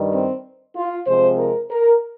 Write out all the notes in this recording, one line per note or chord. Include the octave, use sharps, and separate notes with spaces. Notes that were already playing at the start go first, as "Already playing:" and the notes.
Already playing: G2 D#3 G3
C4
F4
C3 F3 G#3 C4 C5
A#4
A#4